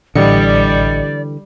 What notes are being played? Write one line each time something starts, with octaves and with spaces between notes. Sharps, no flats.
A1 D3 E3 G3 D5 D#5 C#7